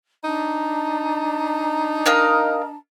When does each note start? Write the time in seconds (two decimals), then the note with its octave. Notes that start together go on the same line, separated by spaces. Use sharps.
0.24 D4 D#4 A5 A#5
2.06 A#4 D#5 F5